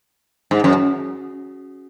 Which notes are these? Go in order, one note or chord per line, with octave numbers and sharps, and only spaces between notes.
G#2
F#2